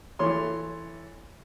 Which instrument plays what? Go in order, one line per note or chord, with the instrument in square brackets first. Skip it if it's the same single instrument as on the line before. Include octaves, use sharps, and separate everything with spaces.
[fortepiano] E3 A4 C#5 C6